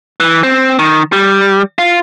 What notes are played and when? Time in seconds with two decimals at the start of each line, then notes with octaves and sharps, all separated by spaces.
0.20 E3
0.43 C4
0.79 D#3
1.12 G3
1.79 F4